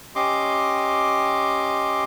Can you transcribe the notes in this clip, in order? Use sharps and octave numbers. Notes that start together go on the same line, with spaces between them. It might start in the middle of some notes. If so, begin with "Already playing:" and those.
C#4 G4 D#5 C6 D6